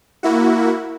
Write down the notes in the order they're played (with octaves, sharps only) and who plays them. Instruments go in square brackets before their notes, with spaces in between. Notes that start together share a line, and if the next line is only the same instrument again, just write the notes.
[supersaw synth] A#3 E4 F#4